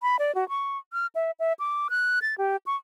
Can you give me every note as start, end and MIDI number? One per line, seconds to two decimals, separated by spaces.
0.02 0.17 83
0.19 0.34 74
0.35 0.47 66
0.49 0.78 85
0.93 1.07 89
1.15 1.31 76
1.40 1.53 76
1.59 1.88 86
1.90 2.19 90
2.22 2.35 93
2.38 2.57 67
2.66 2.76 85